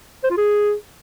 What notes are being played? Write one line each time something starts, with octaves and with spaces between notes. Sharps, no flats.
C5
F4
G#4